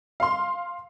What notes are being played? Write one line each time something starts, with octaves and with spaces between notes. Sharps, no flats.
F5 C6